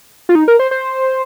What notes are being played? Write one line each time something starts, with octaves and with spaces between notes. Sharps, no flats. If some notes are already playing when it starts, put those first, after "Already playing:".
F4
D#4
A#4
C5
C5